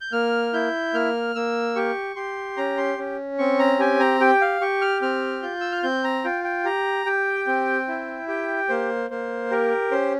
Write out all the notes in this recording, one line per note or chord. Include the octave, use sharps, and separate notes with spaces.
G6
A#3 F6
E4 G6
A#3 F6
A#3 E6
G4 C#6
G4 C6
C#4 A#5
C6
C#4
C4 C#6
A#5
G4 G#5
A#5
G4 G5
F5
G4 C#6
F6
C4 F6
F4 G6
E6
F6
C4 G6
A#5
F4 G5
G5
G4 A#5
G4 G5
C4
E4
G4 G5
A#3 C5
A#3 C5
G4 A#4
C#4 C5